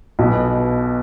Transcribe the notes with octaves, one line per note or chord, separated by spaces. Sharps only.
B1 B2 B3